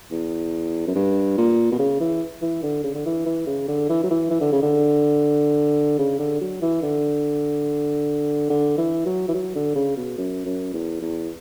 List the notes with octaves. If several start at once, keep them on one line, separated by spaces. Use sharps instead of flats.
E2
F#2
G2
A#2
B2
C#3
E3
E3
D3
C#3
D3
E3
E3
C#3
D3
E3
F#3
E3
E3
D3
C#3
D3
C#3
D3
F#3
E3
D3
D3
E3
F#3
E3
F#3
D3
C#3
B2
F#2
F#2
E2
E2